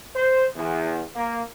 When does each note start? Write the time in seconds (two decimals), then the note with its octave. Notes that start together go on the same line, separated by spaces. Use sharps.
0.15 C5
0.56 E2
1.16 A#3